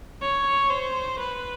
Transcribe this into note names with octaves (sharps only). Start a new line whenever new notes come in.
C#5
C5
B4